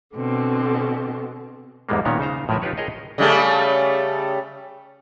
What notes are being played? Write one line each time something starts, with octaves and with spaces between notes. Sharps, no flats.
B2 D3 C4
E2 G#2 G3 G#3 A#3
A#2 D#3 B3 C#4 A#4 C#5
C#3 D#4 C5 A#5
A2 F3 G#3 A#4 B4 E5
D#4 F4 G4 B4 C#5
G#4 A#4 C#5 D#5 G5
C#3 G3 A3